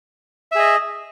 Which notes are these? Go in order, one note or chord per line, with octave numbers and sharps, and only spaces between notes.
G#4 D#5 E5